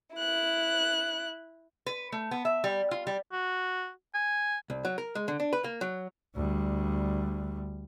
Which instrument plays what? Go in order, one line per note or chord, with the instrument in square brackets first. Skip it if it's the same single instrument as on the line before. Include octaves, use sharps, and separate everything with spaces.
[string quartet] E4 F#6
[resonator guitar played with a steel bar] B4
A3
B3
E5
G3
F4
G3
[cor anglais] F#4
G#5
[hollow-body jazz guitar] C2
F#3
A#4
G#3
D3
D4
B4
A#3
F#3
[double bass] D2 G3